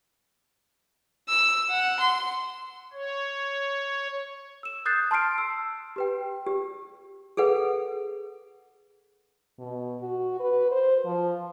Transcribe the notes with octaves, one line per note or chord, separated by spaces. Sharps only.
E6
F#5
C6
C#5
E6 E7
D#6 F#6 G6 A6 C7
A5 C6 F6 C7 D7
E6
G4 B4 G5
G4
G#4 A4 B4 F#5
B2
F#4
B4
C5
F3